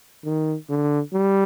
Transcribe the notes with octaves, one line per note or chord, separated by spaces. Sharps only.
D#3
D3
G3